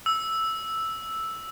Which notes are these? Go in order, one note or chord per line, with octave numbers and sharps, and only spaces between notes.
E6